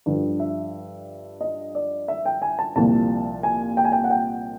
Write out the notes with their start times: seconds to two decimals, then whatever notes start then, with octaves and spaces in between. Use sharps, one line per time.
0.06 G2 D3 F3
0.40 E5
1.41 D#5
1.75 D5
2.08 E5
2.26 G5
2.42 G#5
2.59 A5
2.76 C2 A#2 F3 A5
3.43 G#5
3.77 G5
3.84 G#5
3.92 G5
4.04 F#5
4.10 G5